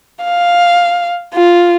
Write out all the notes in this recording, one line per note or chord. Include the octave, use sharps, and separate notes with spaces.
F5
F4